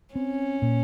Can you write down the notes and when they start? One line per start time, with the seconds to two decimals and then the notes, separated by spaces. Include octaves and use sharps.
0.15 C4 C#4
0.62 A#2